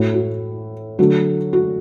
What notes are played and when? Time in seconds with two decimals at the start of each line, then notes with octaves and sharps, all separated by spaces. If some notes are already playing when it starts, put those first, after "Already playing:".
Already playing: A2 A3 F#4
0.14 F#4
0.98 D3 F#3 A3 F#4
1.53 F#4